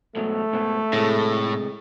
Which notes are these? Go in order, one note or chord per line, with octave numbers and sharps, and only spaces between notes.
G#2 B2 F#3 A3
G#2 B2
A2 C3 G#3